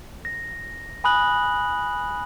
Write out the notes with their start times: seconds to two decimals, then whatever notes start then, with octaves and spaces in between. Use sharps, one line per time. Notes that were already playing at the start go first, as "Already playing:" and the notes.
0.25 A#6
1.04 G#5 B5 D#6 F#6 F#7